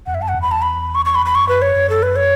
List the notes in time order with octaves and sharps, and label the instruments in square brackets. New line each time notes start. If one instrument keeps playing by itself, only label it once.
[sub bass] E2 [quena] F#5
[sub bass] F#2 [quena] E5
[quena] A5
F#5
[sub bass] E2
[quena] B5
A5
B5
C#6
C#6
B5
B5
[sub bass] F#2 [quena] C#6
[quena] B4
C#5
[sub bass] F#2
[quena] A4
B4
C#5